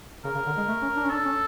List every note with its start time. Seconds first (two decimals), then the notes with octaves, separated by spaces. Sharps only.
0.24 C#3 A#4
0.35 C#3
0.46 D3
0.57 G#3
0.68 A3
0.82 C#4
0.96 D4
1.05 C#4
1.11 D4 A4
1.26 C#4